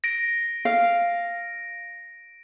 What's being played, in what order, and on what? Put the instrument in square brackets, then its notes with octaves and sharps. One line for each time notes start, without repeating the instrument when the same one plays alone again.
[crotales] A#6 D7
[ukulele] F5